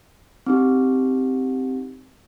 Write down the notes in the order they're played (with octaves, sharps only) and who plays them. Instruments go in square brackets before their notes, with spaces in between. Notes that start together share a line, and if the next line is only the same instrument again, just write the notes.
[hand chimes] C4 D#4 G4